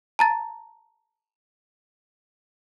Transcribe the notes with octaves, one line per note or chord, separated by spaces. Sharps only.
A5 A#5 A6